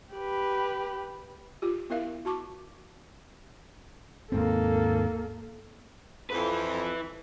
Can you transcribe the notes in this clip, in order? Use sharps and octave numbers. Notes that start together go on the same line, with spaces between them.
G4 B4
F4 G4
B3 E4 A#4 E5 F5
F#4 A5 C#6 D6
D#2 G#2 A#3 C4 A4
F2 E3 B4